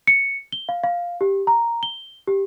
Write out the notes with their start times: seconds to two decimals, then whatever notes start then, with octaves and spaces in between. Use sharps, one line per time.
0.07 C#7
0.52 G7
0.69 F5
0.84 F5
1.21 G4
1.47 A#5
1.83 G7
2.27 G4